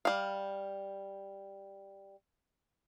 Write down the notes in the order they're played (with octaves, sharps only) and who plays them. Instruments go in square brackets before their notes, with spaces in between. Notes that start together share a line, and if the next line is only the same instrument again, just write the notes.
[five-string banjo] G3 F5